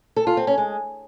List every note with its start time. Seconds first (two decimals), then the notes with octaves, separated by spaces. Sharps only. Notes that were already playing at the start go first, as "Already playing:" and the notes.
0.16 A4
0.27 F4
0.37 C4
0.47 C#4
0.58 G#3